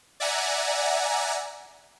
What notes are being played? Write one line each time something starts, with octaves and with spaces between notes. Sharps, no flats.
D5 E5 F#5 G#5 A#5